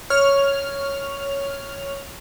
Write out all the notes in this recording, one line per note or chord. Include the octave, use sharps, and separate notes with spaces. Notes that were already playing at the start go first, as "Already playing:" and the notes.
C#5 F6